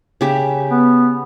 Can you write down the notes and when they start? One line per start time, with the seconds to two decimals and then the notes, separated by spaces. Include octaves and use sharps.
0.21 C#3 G4 E5
0.70 B3